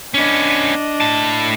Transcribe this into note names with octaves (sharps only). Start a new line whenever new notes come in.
B3 C#4 D4 D#5
A2 A5